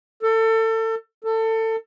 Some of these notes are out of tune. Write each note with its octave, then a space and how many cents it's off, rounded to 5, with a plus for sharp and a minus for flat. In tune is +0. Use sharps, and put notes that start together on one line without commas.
A4 +30
A4 +25